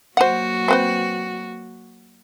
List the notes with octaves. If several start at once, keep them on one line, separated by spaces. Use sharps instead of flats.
F#3 A#3 F#4 C5 F#5
C4 B4 C5